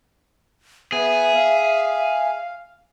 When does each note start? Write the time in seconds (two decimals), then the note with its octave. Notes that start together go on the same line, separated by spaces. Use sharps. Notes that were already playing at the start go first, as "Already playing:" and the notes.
0.92 B3 G#4 E5
1.36 F5